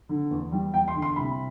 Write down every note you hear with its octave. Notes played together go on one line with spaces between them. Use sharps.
D3
E2
G3
E2 G5
C6
D3
C6
C2 B5